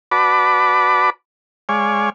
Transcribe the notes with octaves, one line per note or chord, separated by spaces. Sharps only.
F#4 B4 D5 A5 B5 D6
G#3 C#5 D5 F5 G#5